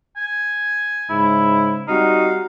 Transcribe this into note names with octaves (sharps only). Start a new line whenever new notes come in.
G#5
G#2 C#3 E4
G3 C4 D#4 F#4 F5